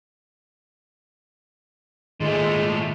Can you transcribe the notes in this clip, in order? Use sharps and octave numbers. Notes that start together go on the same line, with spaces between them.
A#2 D#3 G#3 A3